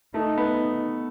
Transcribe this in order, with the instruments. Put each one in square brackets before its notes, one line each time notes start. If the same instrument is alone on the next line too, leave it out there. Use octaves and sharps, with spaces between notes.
[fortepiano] A3 [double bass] D#4
[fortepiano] B3